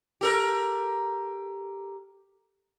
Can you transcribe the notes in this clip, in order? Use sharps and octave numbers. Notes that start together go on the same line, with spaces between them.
G4 A4 A#4